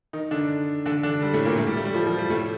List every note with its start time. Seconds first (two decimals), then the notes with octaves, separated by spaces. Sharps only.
0.13 D#3 D#4
0.31 D3 D4
0.86 D3 D4
1.03 D3 D4
1.22 G3
1.33 A2 A3
1.45 A#2 A#3
1.58 A2 A3
1.67 G3
1.77 A3
1.85 G3
1.95 F3
2.07 F3
2.18 G3
2.30 A2 A3